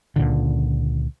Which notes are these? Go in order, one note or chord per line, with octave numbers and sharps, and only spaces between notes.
C#2 A#2 D3